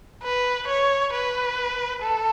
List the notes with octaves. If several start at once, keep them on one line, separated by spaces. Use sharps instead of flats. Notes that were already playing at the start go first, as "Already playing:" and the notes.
B4
C#5
B4
A4